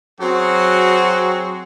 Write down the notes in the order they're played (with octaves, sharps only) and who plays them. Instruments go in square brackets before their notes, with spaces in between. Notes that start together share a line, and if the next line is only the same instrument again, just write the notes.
[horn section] F#3 C4 F#4 G#4